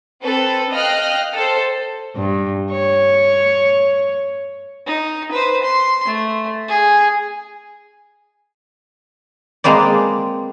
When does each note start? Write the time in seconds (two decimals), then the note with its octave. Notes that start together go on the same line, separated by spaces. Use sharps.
0.23 C4 A4 B4
0.72 D#5 F5 G5 F6 F#6
1.34 A4 C5
2.15 G2
2.71 C#5
4.87 D#4
5.32 B4 C5
5.63 C6
6.06 A3
6.69 G#4
9.64 G#3 A#3 C4 B4 D5